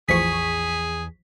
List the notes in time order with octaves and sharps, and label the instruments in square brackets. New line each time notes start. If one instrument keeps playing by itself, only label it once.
[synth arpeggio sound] A1 F3 C#6 [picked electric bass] E2 [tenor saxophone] G#4 [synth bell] B6